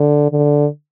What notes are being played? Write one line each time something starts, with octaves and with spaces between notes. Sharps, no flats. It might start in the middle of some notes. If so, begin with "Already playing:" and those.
Already playing: D3
D3